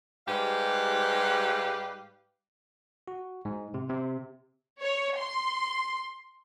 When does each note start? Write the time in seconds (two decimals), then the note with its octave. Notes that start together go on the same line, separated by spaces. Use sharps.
0.28 G#2 G3 G4 B4 F5
3.08 F#4
3.45 G#2
3.74 C3
3.90 C3
4.81 C#5
5.17 C6